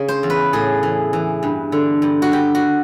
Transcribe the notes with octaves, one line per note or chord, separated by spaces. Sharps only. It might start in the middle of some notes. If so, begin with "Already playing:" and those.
Already playing: C#3
C5
E2
B4
A2 G#4
E3
E3
G2
D3
G2
F#4
G2 G4
F#4